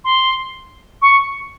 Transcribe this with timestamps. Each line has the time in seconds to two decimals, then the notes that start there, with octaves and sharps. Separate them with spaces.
0.04 C6
1.01 C#6